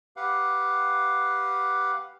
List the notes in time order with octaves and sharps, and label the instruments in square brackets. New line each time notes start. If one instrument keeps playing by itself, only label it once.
[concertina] G4 B4 F5 F#5